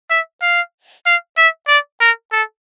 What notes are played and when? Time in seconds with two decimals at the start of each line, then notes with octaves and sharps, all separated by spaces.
0.10 E5
0.42 F5
1.06 F5
1.37 E5
1.68 D5
2.01 A#4
2.32 A4